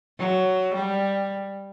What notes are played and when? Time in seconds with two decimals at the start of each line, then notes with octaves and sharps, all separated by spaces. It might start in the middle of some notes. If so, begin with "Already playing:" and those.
0.19 F#3
0.75 G3